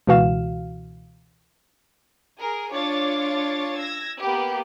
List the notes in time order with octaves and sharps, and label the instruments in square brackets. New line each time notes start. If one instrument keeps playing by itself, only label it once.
[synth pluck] C#2 B2 E3 F#4 F5 E7
[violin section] G#4 A#4
D4 F4 C#5 D6 A6
E6 G#6 A#6
A#3 B3 G4 B4